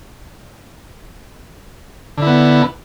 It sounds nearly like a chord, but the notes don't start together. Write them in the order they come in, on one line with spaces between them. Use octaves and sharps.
D3 E4 B3